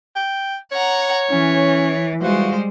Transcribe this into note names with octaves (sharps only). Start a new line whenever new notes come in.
G5
C#5 F#5 A#5
E3 C#4
E3 G3 G#3 F4 F#4 C5